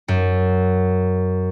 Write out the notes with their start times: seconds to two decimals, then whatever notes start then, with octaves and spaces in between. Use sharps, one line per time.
0.08 F#2